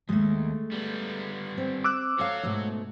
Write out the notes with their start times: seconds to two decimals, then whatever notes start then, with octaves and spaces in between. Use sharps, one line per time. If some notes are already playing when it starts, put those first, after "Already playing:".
0.09 D#2 G#3 A3
0.72 G3 B3
1.58 C4
1.84 D6 E6 F#6
2.19 F#4 A4 C#5 F5
2.43 G#2 B2 A3